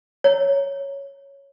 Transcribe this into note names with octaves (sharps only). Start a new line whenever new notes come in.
C#5